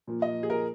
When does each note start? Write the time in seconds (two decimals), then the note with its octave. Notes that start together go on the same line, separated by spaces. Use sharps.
0.07 A#2 F3 A#3
0.22 D#5
0.43 G#4
0.50 A#4